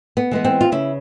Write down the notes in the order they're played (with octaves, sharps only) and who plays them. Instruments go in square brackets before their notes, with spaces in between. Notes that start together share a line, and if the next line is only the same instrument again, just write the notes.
[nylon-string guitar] B3
E3 G#3 B3
C4
F4
C#3 E4